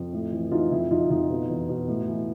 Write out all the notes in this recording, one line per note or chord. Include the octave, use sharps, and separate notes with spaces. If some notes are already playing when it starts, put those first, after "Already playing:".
Already playing: F2
A2
E3
E3 D#4 F4
F2 E4
F2 D#4 F4
F2 D#4 F4
B2
E2
B2
A2
E3